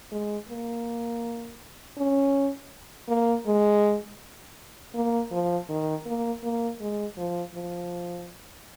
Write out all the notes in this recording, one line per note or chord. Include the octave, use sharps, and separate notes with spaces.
G#3
A#3
C#4
A#3
G#3
A#3
F3
D#3
A#3
A#3
G#3
F3
F3